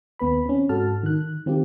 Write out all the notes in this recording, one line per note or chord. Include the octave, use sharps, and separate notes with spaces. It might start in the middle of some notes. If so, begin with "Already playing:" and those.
D#2 B3 B4 B5
C4 C#4
G#2 F#4 A4 A5 F6
D#3 F#6
D#3 C4 F4 G4